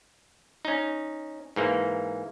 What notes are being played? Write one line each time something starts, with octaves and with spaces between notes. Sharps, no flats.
C#4 D#4
G#2 E3 A#3